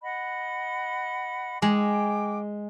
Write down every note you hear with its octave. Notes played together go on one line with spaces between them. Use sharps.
D#5 F#5 B5
G#3 G5 D6